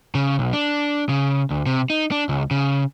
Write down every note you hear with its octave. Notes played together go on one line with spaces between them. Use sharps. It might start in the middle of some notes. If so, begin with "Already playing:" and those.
C#3
B1
D4
C#3
D2
C3
D#4
D4
C#2
C#3